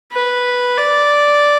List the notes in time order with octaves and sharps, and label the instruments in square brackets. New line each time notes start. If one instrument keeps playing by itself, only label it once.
[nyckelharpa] B4
D5